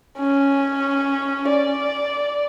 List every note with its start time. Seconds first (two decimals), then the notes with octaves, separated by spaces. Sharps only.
0.19 C#4
1.49 D5